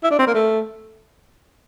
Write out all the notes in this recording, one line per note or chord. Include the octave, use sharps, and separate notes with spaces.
E4
D4
C4
A#3
A3